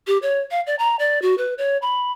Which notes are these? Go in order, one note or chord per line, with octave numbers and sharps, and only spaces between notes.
G4
C#5
F5
D5
A#5
D5
F#4
B4
C#5
B5